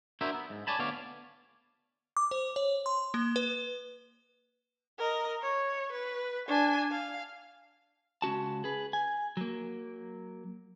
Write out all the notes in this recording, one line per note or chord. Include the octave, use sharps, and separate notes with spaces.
D4 E4 F#4 A#4 C5 E5
B3
G#2
C#5 D5 G#5 A5 B5
D2 B3 C#5 D5 F5
D6
C5
C#5
C6
A#3
B4
A#4 D#5
C#5
B4
D4 G#5
F5
C#2 C#4 F#4 A5
G#4 B4
G#5
F#3 A#3